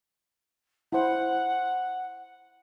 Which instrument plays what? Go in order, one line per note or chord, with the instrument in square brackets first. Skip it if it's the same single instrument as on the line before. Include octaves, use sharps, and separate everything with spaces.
[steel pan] E4 C5 [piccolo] F#5